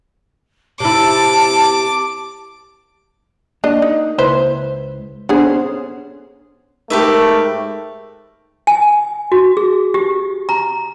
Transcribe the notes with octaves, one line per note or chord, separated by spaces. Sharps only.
C3 E4 A5 D6
A#3 D4 D#5
D#4
C#2 E4 B4 C5
B3 D4 G#4 A4 C5
C#4
G#2 A3 G4 A#4 B4 E5
G#5
F#4
G#4
G4
A#5